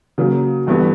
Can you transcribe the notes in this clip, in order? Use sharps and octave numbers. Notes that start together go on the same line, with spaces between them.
C#3 F#3 A#3
G1 G2 E3 B3